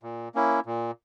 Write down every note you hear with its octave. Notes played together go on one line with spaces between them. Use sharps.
A#2
A#3 C#4 E4
A#2